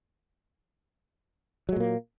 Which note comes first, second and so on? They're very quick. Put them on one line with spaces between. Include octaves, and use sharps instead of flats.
F#3 G#3 A#2 A#3